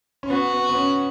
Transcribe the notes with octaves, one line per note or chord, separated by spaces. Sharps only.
C#4
B3 F#4
B3
B3
C#4